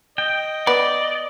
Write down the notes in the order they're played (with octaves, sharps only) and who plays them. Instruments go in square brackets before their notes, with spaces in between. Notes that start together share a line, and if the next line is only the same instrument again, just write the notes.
[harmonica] D#5 [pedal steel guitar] G5
[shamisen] B3 [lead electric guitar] D5